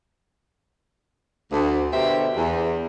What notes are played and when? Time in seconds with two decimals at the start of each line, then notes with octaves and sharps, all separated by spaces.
1.52 D2
1.91 B2 D3 G4 A#4 C5 E5
2.37 E2